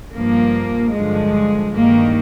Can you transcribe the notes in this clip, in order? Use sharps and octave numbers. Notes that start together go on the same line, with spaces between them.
G2 F3 A#3
G2 D3 F3 G#3
G2 D#3 A#3